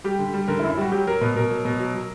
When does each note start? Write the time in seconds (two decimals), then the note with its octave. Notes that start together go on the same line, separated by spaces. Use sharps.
0.04 G3 G4
0.19 D3
0.34 G3
0.48 D3 A#4
0.59 E4
0.63 F#2
0.70 E4
0.78 G3 F#4
0.92 F#3 G4
1.07 F#3 A#4
1.21 B2 B4
1.36 B2 A#4
1.50 F#3
1.65 B2
1.79 F#3
1.94 F#3